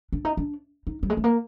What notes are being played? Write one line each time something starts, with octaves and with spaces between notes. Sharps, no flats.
D4
D#4
D4
D#4
G3
G#3
A3
A#3